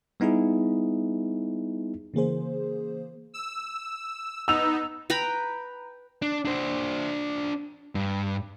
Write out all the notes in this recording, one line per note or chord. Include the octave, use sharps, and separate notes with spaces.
G3 B3 D#4 E4 G#4
C#3 E3 A#3 G#4 C5
E6
B3 D#4 E6 F7
B4 G5 A#5 B5
D4
D4 C5
G2